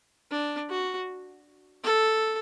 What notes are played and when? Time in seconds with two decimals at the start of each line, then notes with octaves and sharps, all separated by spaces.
0.31 D4
0.70 F#4
1.84 A4